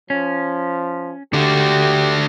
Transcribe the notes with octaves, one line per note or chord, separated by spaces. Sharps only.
F3 C#4
D3 D4 F#4 G4